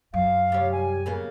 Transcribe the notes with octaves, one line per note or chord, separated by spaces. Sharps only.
F#2 F5
C3 G3 C#5
G#5
C#3 A#3 B3